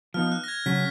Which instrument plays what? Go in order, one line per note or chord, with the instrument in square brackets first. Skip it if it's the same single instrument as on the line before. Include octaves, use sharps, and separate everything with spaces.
[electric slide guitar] F3 B3 D#4 [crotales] F6
[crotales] F#6
A#6
G#6
[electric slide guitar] C#3 F#3 C#4 [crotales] B6